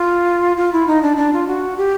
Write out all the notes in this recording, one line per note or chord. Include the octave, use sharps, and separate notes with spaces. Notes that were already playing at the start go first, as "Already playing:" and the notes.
Already playing: F4
F4
E4
D#4
D4
D4
F4
F#4
G4